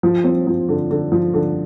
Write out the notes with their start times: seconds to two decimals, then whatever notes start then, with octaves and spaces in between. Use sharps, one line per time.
0.03 F3
0.24 C4
0.47 F3
0.69 D3
0.91 D3
1.12 F3
1.34 D3